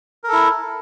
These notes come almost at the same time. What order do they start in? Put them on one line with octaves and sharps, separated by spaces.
A#4 A4 E4